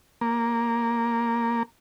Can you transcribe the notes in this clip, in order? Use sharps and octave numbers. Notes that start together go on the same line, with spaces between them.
A#3